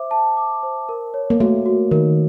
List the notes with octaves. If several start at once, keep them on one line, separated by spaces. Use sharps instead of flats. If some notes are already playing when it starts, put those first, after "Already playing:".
Already playing: C5 E5 D6
A5
D6
C5
A#4
C#5
A#3
A3 F#4
F#4
D#3 A#4